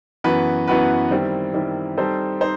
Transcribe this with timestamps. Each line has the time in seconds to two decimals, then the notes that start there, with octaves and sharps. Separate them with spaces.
0.24 F#2 E3 B3 F#4 B4
0.68 F#2 E3 B3 F#4 B4
1.10 D#3 G3 C4 E4
1.54 D#3 G3 C4 E4
1.97 G3 C4 D#4 A4 C5
2.41 D#4 C5